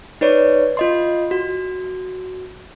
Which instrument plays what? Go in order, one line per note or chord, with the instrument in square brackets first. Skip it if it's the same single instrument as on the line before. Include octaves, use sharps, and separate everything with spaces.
[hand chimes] D#4 B4 C#5 D5
F4 D#5 C6
F#4